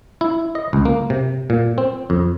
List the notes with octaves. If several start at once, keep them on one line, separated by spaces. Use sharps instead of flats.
E4
D#5
C#2
A#3
C3
A#2
C4
F2